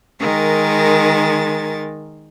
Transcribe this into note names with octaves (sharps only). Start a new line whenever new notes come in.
D#3 G#3 A#4 A6